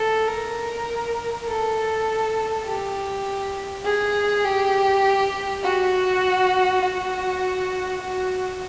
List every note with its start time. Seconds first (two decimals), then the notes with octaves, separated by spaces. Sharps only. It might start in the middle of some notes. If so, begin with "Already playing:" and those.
Already playing: A4
0.28 A#4
1.47 A4
2.65 G4
3.84 G#4
4.44 G4
5.63 F#4
6.81 F#4
8.01 F#4